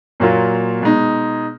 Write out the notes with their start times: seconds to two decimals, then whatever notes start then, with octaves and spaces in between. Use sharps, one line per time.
0.20 A#2 F#3 A#3 F4
0.81 B2 G#3 D#4